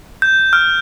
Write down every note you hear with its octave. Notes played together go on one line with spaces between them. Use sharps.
G6
F6